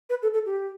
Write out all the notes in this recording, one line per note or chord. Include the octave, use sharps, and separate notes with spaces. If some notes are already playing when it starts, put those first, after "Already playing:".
B4
A4
A4
G4